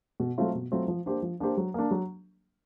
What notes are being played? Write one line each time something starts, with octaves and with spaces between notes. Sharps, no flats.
B2
F#3 A3 C4 F4
B2
F#3 A3 C4 F4
F3
A#3 D4 G4 C5
F3
A#3 D4 G4 C5
F#3
A#3 D4
F#3